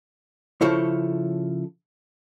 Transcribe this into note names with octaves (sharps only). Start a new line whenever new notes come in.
C#3 F3 E4 A4 C#5